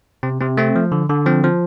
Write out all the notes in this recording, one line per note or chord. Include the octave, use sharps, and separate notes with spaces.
C3 C4
C3 C4
A3 C4
F3
D3
D3
F3 C4
F3